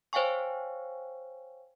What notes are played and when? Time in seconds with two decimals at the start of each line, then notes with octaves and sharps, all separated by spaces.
0.13 C5 C#5 F5 G5 G#5 C#6